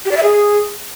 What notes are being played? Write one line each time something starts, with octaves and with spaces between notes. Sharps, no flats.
G4
D5
E5
G#4